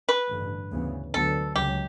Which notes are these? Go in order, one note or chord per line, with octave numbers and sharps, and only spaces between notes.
B4
A1 G2 D3
D2 C#3 E3 B3
D2 D3 F#3 B3 A4
C#2 C#3 F#3 G4